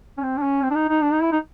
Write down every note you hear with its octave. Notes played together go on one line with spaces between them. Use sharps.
C#4
C4
D4
C#4
C4
D4
D#4
D#4
D4
D#4
E4
D#4